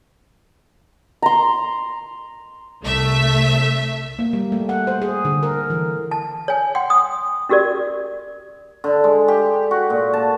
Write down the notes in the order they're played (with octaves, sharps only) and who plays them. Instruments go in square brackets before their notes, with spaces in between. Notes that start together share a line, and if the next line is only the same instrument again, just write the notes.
[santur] A#5 C6
[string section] C2 A3 E5
[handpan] A#3
G3
A3
F#5
C5
G#4
D3
A#4
E3
[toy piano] A5
C#5 G#5
F#5 G5 C6
D#6
C#4 F#4 G4 A#4 D5
[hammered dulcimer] D3
G#3
G4
F#4
A#2
A5